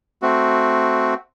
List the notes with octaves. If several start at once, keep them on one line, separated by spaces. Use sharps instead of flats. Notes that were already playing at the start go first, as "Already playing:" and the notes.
A3 C4 F#4